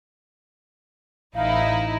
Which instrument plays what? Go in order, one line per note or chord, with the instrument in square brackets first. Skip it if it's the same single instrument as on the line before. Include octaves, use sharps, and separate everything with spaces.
[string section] A1 D#4 E4 [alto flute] F5